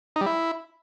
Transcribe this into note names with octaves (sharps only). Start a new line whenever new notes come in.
D#4
G3
E4